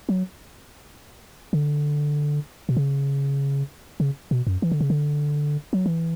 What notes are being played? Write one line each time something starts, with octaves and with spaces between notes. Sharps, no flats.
F#3
D3
B2
C#3
C#3
B2
F#2
E3
D3
C#3
D3
F#3
E3